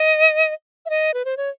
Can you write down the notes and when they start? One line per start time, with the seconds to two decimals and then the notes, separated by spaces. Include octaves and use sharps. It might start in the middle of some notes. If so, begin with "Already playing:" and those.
Already playing: D#5
0.86 E5
0.90 D#5
1.14 B4
1.25 C5
1.37 C#5